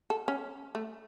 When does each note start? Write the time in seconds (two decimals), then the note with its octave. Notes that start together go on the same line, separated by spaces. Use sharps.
0.10 A4
0.28 C#4
0.75 A3